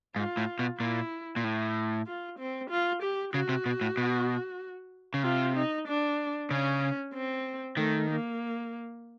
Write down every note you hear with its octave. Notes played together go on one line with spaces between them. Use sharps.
G#2 F4
A2
B2
A#2 E4
A#2
A2
F4
C4
F4
G4
C#3 F#4
C3
B2
A2
B2
C#3
C3 F4
D#4
D4
C#3 C#4
C4
D#3 A3
A#3